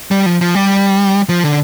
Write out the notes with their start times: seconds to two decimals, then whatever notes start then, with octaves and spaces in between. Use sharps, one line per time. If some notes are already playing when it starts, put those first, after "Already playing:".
0.11 G3
0.26 F3
0.41 F3
0.55 G3
1.29 F3
1.44 D3